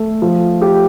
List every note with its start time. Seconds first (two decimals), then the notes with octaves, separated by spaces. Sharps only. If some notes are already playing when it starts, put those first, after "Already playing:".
Already playing: A3
0.22 F3
0.62 G4